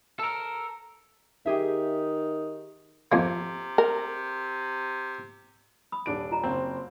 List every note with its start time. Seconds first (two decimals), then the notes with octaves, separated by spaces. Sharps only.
0.19 A4 A#4
1.46 D#3 G4 G#4 E5
3.12 F2 C3 A#3
3.78 A#4
5.92 B5 D#6
6.06 D#1 D4 D7
6.31 F4 A#5
6.43 F#1 C4